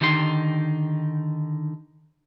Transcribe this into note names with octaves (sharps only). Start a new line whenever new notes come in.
D3 D#3 D#4 G4 C#5 C6